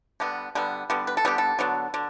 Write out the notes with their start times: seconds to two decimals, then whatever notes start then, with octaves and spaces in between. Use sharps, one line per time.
0.20 D3 G3 B3
0.55 D3 G3 B3
0.90 D3 G3 B3
1.07 B4
1.17 A4
1.25 D3 G3 B3 G4
1.38 A4
1.59 D3 F#3 B3
1.94 D3